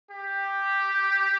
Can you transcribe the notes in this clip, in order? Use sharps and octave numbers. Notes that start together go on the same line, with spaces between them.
G4